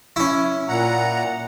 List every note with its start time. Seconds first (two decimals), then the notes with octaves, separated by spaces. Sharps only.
0.16 C#4 E4
0.69 A#2 F#5 A#5